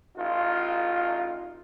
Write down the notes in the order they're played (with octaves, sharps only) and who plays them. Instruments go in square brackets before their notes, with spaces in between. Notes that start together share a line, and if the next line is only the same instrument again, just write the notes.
[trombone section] A1 D#4 F4